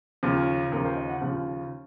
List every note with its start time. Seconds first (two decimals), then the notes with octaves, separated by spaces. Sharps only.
0.23 D#2 C#3 F3
0.72 D#2 C#3 F3 A#4
0.85 C5
0.97 D#5
1.09 F#5
1.21 D#2 C#3 F3